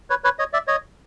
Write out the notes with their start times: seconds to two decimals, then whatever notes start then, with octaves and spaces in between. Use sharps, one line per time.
0.10 B4 C#5
0.24 B4 C#5
0.39 C#5 D#5
0.53 D5 E5
0.67 C#5 D#5